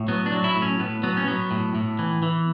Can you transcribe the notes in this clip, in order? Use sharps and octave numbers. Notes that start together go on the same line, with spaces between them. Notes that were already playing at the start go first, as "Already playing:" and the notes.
Already playing: A2
F#3 B3
D4
F#3
E4
A2
C#4
A2 B3
F#3 B3
C#4
F#3 B3
A2
A2
E3
E3